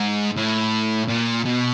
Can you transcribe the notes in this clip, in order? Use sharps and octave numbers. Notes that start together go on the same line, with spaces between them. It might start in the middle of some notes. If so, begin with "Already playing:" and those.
Already playing: G#2
A2
A#2
B2